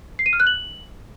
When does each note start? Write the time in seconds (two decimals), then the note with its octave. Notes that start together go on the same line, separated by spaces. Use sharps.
0.19 C7
0.26 D#7
0.33 F6
0.40 F#6
0.47 F#7